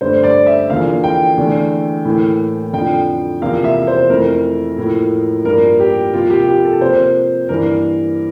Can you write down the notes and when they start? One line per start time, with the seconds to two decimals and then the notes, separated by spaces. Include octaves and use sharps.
0.01 G2 D3 A3 C5
0.24 D5
0.46 E5
0.69 E2 D3 F3 A#3 F5
1.04 G5
1.38 E2 D3 A3
2.05 A2 E3 A#3
2.73 F2 D3 F3 G5
3.42 E2 C3 F3 A#3 F5
3.64 E5
3.87 C5
4.10 F2 E3 A3 A#4
4.78 A2 F3 A#3
5.45 G2 F3 A#3 A#4
5.80 G4
6.13 C3 F3 A#3 F4
6.30 G4
6.48 G4
6.65 A4
6.81 C3 F3 A#3 C5
7.49 G2 E3 A#3 A#4